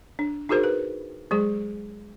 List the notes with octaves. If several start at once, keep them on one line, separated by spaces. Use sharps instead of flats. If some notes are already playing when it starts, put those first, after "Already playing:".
D4
D#4 F#4 G#4 A#4 C5
B4
F#3 G#3 G#4